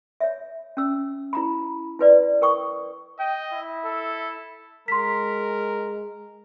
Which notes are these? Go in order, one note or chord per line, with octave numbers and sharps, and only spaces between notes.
C#5 E5
C#4 E6
E4 A#5 B5
E4 B4 D5
A#4 G5 C#6 D#6
D#5 G5
E4
A4
G#3 A#4 C6 B6